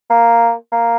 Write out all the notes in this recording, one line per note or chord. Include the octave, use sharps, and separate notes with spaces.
A#3
A#3